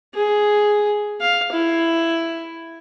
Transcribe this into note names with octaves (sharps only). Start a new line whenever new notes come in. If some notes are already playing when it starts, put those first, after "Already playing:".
G#4
F5
E4